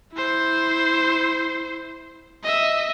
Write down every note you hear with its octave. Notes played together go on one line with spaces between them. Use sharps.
E4 C5
D#5 E5